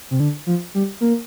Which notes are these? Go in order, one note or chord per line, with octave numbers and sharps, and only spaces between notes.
C3
D3
F3
G3
A#3